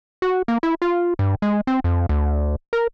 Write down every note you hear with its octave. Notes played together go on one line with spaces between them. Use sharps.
F#4
A#3
E4
F4
G2
G#3
C4
F2
D2
A#4